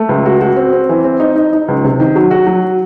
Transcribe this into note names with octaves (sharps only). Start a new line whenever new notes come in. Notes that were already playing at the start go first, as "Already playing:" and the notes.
Already playing: A3
C#2
F#4
F#4
C4
C4
E3
C4
D#4
D#4
D#4
C#2
C3
D#3
F#3
F#4
F#3